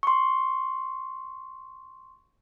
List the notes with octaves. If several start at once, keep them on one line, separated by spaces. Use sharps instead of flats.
C6 C#6